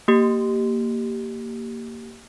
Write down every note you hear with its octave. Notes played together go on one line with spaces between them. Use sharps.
A#3 G4